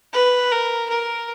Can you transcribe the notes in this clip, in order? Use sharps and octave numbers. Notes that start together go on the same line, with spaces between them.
B4
A#4
A#4